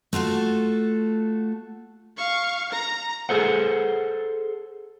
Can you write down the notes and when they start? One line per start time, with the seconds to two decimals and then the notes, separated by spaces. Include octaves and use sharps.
0.13 A3 F4 F#4 A4
2.17 F5 C#6
2.72 A#5 A#6
3.29 G#4 A4 C5 F#5